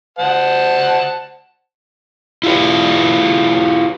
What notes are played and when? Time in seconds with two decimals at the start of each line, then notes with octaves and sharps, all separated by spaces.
0.19 C5 F#5 A5
2.43 E4 F4 G4 B4